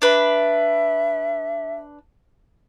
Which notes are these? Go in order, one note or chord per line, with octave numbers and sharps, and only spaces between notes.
D4 B4 E5